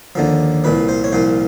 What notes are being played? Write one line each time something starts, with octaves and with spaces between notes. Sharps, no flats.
D#2 D3 F3
C2 A#2 F3 B4
C5
C#5
C2 A#2 F3 C5